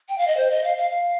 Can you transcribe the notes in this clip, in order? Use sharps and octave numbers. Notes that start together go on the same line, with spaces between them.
G5
F5
D#5
C5
D#5
F5
F5
F5